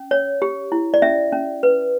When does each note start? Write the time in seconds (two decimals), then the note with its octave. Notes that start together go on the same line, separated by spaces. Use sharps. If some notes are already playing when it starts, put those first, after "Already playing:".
Already playing: C#4
0.11 C#5
0.42 G4
0.72 E4
0.94 D5
1.02 C#4 E5
1.32 C#4
1.63 B4